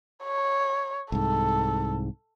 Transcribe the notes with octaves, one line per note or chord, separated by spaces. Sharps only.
C#5
C2 G#2 A4